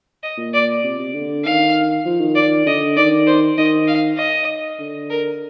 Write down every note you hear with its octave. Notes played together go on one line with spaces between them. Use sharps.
D#5
A#2
D5
C3
C3
D3
D#3 F5
F3
D#3
D5
D3 D#5
D#3 D5
C5
D#3 D#5
F5
D#5
D3
A#4